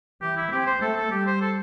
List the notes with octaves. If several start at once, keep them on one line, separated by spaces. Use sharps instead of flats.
E3 G4
E4
C4 G4
C5
A3 A4
A4
G3 G4
C5
A4